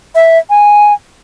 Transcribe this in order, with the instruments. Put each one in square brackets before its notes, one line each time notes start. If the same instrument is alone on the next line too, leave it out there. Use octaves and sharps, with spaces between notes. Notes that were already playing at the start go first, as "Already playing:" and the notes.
[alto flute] E5
G#5